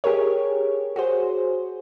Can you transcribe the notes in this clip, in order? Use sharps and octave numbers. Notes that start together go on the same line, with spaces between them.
G4 G#4 A#4 C#5
F#4 G#4 C5